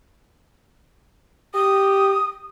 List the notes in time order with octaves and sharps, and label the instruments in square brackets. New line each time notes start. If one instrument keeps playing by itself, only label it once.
[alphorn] G4 [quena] D#6